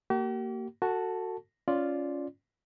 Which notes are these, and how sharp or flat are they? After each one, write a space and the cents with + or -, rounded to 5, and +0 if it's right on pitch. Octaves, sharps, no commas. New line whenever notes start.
A#3 -20 G4 -45
F#4 +0 A4 +30 A5 +0
C#4 +10 F4 +0 D5 +0